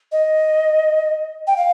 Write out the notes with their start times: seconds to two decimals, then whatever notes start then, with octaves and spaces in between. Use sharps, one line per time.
0.12 D#5
1.47 G5
1.57 F5